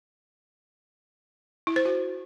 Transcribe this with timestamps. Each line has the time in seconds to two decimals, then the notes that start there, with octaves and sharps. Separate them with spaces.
1.67 E4
1.76 C5
1.85 F#4